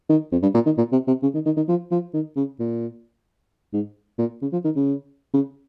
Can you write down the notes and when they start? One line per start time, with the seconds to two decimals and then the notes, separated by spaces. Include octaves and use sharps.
0.09 D#3
0.32 F2
0.42 G2
0.54 A#2
0.66 D#3
0.78 A#2
0.92 C3
1.07 C3
1.22 C#3
1.34 D#3
1.46 D#3
1.56 D#3
1.68 F3
1.91 F3
2.13 D#3
2.36 C#3
2.59 A#2
3.73 G#2
4.18 A#2
4.42 C#3
4.53 F3
4.64 D#3
4.76 C#3
5.33 C#3